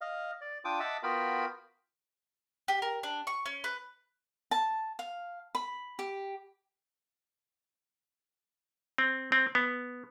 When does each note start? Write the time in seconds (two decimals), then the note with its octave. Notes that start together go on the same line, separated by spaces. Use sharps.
0.01 D#5 F5
0.41 D5
0.65 D4 F4 G5 D6 D#6
0.80 D#5 E5 F#5 A5 D6 E6
1.03 B3 F4 F#4 A#4 G5 B5
2.68 G4
2.82 A#4
3.03 D4
3.27 C#6
3.46 C#4
3.64 B4
4.51 A5
4.99 F5
5.55 B5
5.99 G4
8.98 C4
9.32 C4
9.55 B3